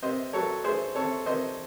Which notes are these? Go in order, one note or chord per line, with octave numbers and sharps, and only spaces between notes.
C3 C5 D#5
F#3 A4 C#5
A3 G#4 C5
C3 A4 C#5
C3 C5 D#5